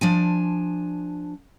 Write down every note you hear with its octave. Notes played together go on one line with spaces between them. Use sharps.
F3 D4 G#5